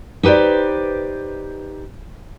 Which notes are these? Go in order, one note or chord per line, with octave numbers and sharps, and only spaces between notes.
D#4 G4 B4 C5 D5